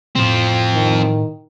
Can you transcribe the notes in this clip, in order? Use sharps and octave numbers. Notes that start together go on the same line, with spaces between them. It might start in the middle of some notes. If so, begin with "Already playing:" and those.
A2 F3 C4
D#3